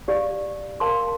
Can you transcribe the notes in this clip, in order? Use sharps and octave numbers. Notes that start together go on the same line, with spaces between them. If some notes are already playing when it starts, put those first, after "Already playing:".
G4 D5 F5
A#4 F5 A5 C6